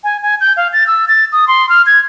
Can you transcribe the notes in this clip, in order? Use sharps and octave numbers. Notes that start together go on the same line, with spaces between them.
G#5
G#5
G6
F5
A6
E6
A6
D#6
C6
F6
G#6